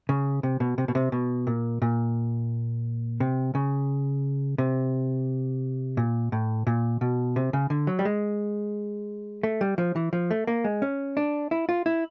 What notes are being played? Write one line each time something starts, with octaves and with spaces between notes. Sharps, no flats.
C#3
C3
B2
C3
B2
C3
B2
A#2
A#2
C3
C#3
C3
A#2
A2
A#2
B2
C3
C#3
D3
F#3
G3
G#3
A3
G3
F3
E3
F3
A3
A#3
G#3
C#4
D4
E4
F4
E4